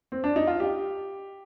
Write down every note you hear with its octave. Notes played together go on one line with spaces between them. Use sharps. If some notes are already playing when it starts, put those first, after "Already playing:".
C4
D4
D#4
F4
G4